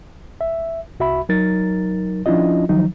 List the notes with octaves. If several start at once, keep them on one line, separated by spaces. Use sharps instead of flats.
E5
C2 F#4 E5 B5
F#3 D#4 A#4 A6
F3 C#4 D4 E4 F4 D#5
D#3 F3 F#3 D#4